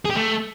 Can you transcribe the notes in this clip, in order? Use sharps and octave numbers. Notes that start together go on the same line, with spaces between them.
G#4
G4
A3